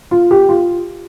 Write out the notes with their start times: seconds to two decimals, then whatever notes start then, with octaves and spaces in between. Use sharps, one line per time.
0.11 F4
0.31 G4
0.49 F4